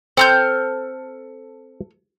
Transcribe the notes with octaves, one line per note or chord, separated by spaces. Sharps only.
C4 A4 F6 G6